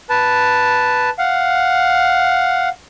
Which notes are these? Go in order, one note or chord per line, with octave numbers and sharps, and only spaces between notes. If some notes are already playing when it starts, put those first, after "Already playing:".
B4 A5
F5 F#5